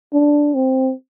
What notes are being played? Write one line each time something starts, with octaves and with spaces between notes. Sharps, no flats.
D4
C4